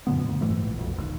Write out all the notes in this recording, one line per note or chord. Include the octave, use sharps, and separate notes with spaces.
F#2 A#2 D3 B3
D2
F#1 G#2 E3 A3
A#1
B1 F2
E1 D#2